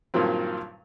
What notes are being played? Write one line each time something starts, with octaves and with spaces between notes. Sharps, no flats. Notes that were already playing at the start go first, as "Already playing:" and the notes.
G2 A#2 D#3 F3 F#3 C4